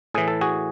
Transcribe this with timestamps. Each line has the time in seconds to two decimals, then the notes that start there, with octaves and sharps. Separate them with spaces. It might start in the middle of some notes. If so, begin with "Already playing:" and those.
0.14 A2 E3 G#4
0.28 A4
0.41 F#4 G#4